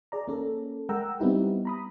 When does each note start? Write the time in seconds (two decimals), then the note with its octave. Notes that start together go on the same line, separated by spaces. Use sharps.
0.12 G#4 D5 A#5
0.28 A#3 C#4 A4
0.89 G#3 A#4 F#5 G5 A#5 E6
1.20 G3 B3 C4 D#4 E4 G4
1.65 A#5 B5 D#6